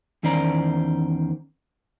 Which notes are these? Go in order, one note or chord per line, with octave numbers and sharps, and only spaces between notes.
E2 D#3 C#4 C5 D5 A#5